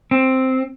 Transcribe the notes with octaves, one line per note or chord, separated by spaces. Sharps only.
C4